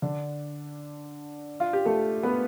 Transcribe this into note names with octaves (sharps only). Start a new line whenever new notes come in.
D3 D4
F4
G4
A3 A4
B3 B4